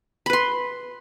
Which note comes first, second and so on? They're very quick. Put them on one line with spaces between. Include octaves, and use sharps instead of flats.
B5 B4 C6